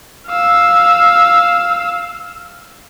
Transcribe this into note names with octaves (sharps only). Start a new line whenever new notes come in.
F5 E6